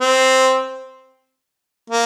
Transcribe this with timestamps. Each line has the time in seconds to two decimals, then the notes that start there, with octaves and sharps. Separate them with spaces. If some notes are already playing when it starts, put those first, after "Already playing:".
0.01 C4
1.90 A#3